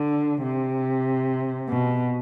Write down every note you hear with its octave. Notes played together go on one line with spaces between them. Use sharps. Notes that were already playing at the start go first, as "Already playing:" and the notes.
Already playing: D3
C3
B2